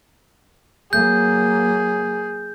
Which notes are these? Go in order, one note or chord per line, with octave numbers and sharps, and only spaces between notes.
F#3 A#3 G#4 G6